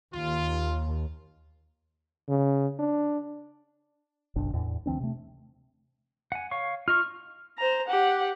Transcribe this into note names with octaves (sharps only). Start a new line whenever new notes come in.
D#2 F4
C#3
D4
F#1 B1 D4
E2 A2
D2 E3 C4 D4
C3 A3
F#5 G#5
C#5 F5 C#6
F4 D#5 C#6 F6
C5 A#5
G4 F#5